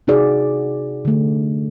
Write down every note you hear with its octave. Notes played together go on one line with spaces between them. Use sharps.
C3 D#4 F#4 G#4 D5
D3 A3